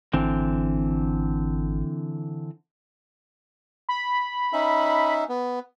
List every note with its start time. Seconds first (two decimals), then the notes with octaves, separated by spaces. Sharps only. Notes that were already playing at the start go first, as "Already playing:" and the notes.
0.13 G#1 D3 E3 C4
3.89 B5
4.53 C#4 D#4 E5
5.29 B3